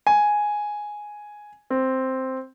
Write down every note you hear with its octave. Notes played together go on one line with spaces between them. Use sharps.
G#5
C4